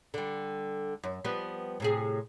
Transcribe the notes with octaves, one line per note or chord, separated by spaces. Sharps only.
D3 G3
F#2
F3 G3 B3
A2 C3 G#4